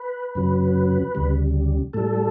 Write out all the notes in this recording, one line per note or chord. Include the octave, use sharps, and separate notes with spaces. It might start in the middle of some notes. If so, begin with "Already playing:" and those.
Already playing: B4
F#2 C#3 F#3
D2 C#3 G3
A2 G3 A4